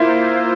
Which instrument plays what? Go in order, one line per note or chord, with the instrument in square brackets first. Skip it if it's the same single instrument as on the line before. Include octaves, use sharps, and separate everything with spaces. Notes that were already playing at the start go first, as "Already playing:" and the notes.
Already playing: [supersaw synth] A#3 F4 C5 [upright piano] E4